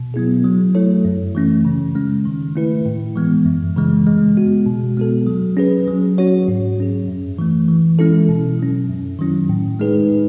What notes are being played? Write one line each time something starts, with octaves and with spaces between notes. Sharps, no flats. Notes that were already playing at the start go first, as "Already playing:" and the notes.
Already playing: B2
F#3 B3 E4 G#4
F#3
A3 E4 A4 C#5
F#2
E3 A3 C#4
C#3
G#3 C#4
D#3
A3 E4 B4
A2
E3 G#3 B3
F#2
C#3 E3 G#3
G#3
B3 F#4
B2
G#3 B3 F#4 A4
F#3
C#4 G#4 B4
F#3
C#4 F#4 C#5
G#2
F#3 C#4 G#4
F#2
E3 A3
E3
G#3 C#4 E4 A4
B2
F#3 C#4
F#2
D#3 F#3 C#4 E4
A2
G#3 D#4 G#4 B4